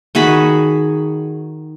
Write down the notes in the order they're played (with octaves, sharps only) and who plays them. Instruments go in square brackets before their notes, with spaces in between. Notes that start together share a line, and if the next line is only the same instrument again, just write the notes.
[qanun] D#3 F#4 G#4 B5